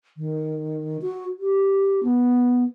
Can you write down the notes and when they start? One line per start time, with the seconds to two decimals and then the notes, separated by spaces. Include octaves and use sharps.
0.17 D#3
1.02 F#4
1.40 G4
2.03 B3